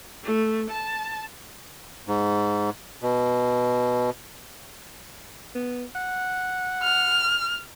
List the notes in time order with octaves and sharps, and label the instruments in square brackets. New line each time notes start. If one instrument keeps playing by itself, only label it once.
[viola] A3
A5
[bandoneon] G#2
B2
[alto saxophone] B3
F#5
[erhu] F6